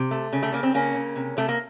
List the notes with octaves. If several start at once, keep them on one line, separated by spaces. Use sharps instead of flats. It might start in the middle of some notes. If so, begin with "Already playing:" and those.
Already playing: C3
A3
C#3
A3
C#3 A#3
C4
C#3 A#3 C#4
C#3
C3
C3 A3
A#3